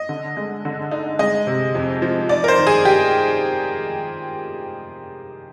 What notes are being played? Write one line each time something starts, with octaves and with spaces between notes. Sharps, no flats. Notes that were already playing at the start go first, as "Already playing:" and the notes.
Already playing: D#5
D3
G#3
D3
D#4
G#3 D#5
C3
F2
F3
D#4 D5
A#4
C5
D#3
G#4
G4